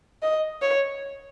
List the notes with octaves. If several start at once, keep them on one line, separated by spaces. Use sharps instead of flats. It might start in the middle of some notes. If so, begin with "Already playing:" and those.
D#5
C#5